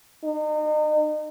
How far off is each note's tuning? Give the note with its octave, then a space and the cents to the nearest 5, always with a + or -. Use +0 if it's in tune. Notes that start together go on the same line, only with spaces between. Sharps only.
D#4 -35